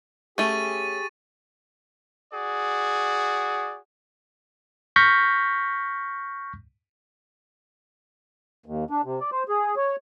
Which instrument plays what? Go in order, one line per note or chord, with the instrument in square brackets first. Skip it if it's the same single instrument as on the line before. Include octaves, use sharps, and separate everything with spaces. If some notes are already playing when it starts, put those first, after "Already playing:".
[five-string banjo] A3 C#4 [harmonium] G4 G#4 [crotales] C#6 A6 D#7
[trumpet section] F#4 G#4 D5
[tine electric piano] C#6 F6 G6 A#6 B6
[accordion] D#2
D4
C3
D5
C5
G#4
C#5